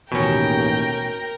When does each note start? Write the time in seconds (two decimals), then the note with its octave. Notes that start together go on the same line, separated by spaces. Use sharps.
0.12 A1 D#2 B2 C#4 A#4 G5